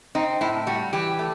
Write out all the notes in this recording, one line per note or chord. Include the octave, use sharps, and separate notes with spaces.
C4 D#4
A2 E4
G3 F#4
E3 G4
A3